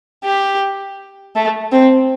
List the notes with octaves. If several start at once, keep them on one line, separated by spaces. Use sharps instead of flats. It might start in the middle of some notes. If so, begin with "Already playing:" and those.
G4
A3
C4